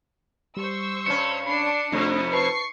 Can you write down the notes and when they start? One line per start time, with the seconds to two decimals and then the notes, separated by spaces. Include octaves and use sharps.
0.57 G3 C5 C#6 E6
1.06 G2 C#4 C#7
1.46 D4 B5 C7
1.92 F2 C3 A3 D4 D#4 D#5
2.33 B4 A5 C#6 C7